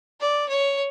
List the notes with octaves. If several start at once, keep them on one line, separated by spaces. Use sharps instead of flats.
D5
C#5